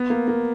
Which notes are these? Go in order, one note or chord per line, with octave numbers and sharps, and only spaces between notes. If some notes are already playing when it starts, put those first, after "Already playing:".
Already playing: B3
A#3
A#3